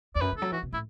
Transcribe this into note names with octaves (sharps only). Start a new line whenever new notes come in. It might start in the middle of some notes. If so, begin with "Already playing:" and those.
E2 D5
F#2 B4
D3
F#3 A4
E3 F#4
B2
A2 E4